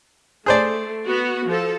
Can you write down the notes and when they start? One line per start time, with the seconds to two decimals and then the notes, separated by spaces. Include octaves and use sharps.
0.46 A3 G#4 C5 D5
1.05 B3 F#4
1.46 F3 A4